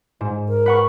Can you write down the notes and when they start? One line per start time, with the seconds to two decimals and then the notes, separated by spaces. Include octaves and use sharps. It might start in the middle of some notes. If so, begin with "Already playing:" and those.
0.21 G#2
0.49 A#4
0.66 B4 F#5 C#6